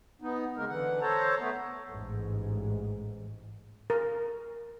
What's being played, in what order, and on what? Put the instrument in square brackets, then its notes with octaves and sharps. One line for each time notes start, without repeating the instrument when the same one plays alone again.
[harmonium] B3 D#4
C#3 G#3 A#3 A#4
D3 E3 F#5
A4 C5 C#5 A5 A#5
A3 B3
[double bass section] A1 G#2
[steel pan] A#4